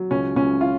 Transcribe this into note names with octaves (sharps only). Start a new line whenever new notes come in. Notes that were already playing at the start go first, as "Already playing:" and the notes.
Already playing: F#3
C#2 C#4
C#2 C#4
F4